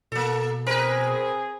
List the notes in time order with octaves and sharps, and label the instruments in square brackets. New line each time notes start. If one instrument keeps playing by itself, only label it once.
[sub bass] B2 [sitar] A#3 A4
[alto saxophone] C4 [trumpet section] G#4 [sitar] A#4 B4